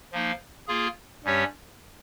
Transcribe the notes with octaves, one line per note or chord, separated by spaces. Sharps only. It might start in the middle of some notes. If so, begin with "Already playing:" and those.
F3 A#3 D#4
A#3 F4 G#4
G2 G3 C#4 G4 C#5